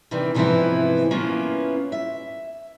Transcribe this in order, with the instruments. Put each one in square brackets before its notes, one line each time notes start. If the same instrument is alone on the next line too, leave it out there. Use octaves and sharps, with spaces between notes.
[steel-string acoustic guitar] C3 D#3 E3 D4
G#2 C3 E3 F3 B3 E4
A#3 B3 C#4 E4 F4
E5